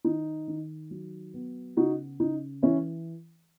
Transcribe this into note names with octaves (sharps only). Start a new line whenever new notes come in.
D#3 D#4
D#3
F#3
B3
C#3 D#4 F#4
C#3 D#4
E3 C#4 E4